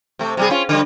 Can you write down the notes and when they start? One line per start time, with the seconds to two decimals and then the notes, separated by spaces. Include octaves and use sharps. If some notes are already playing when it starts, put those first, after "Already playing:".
0.19 C3 A3
0.37 C3 G3 G#4
0.50 C#4 F4
0.69 D3 G3